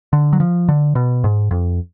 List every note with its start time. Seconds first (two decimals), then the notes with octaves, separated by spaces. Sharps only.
0.13 D3
0.33 F#3
0.40 F3
0.69 D3
0.95 B2
1.24 G#2
1.51 F2